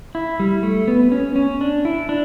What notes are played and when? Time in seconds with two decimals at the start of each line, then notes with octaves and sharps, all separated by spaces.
0.15 E4
0.40 G3
0.63 A3
0.88 B3
1.12 C#4
1.36 C#4
1.61 D4
1.85 E4
2.09 D4